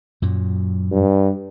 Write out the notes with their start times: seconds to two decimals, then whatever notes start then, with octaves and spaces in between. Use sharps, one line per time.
0.22 F#2 A#2 F#3
0.91 G2